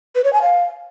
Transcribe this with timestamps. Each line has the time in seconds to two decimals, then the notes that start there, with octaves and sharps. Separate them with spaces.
0.15 B4
0.24 C#5
0.33 G#5
0.42 F5